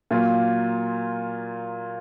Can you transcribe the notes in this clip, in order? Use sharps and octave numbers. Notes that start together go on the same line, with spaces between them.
A#2 F#3 A#3 F4